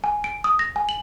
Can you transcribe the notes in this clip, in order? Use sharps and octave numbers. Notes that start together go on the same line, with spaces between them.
G#5
D7
D#6
A#6
G#5
F#7